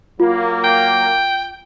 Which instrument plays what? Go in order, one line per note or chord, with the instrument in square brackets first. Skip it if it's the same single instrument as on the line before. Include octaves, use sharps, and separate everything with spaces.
[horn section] F#3 A#3 [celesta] F4
[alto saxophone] G5